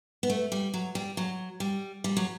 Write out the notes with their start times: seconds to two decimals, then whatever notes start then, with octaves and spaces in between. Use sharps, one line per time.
0.23 B3
0.30 A3
0.52 G3
0.74 F#3
0.95 G3
1.17 F#3
1.60 G3
2.04 G3
2.17 F#3